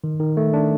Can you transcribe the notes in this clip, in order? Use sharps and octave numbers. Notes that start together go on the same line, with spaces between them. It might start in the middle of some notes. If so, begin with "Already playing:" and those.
D#3
D#3
A3
D4